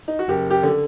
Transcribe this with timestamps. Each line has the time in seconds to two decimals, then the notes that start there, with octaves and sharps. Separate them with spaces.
0.08 D#4
0.19 F#4
0.28 F#1 G4
0.50 G4
0.63 D3